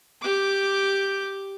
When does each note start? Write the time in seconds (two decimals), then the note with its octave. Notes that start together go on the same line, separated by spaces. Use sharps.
0.22 G4 D6